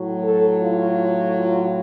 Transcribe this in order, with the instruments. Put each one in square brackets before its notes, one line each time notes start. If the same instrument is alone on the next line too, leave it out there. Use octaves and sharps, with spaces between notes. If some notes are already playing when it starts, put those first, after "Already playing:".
Already playing: [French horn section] A2 F#3
A4
F4
F4